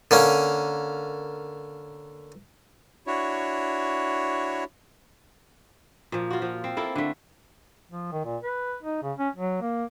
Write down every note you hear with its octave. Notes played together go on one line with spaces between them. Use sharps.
D3 A#3 C#4
D4 E4 F#4 C#5
A#2 F3
F4 F#4
F3
C4
A#3 E4 A4
D3 A3
F3
D#3
A#2
B4
D#4
C#3
C#4
F#3
A#3